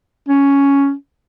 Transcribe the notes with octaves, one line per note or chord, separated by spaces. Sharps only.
C#4